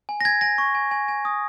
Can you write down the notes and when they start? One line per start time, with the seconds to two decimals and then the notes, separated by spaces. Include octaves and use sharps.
0.09 G#5
0.21 A#6
0.25 G#5 G#6
0.41 G#5 A#6
0.58 C#6
0.75 G#5
0.91 G#5
1.08 G#5
1.25 D#6